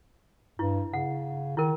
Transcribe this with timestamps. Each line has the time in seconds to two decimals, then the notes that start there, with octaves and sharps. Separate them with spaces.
0.59 G2 E4
0.93 C#3 F#5
1.57 D#3 E4 A#4